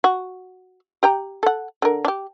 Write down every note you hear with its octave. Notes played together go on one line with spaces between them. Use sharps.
F#4
G4 G5 A#5
A4 F#5
D3 A#4
D4 G4